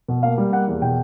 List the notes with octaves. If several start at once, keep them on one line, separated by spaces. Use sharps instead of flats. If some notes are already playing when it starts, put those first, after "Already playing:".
B2
A#3 F5
G3
A#3 F#5
E2
B2 G5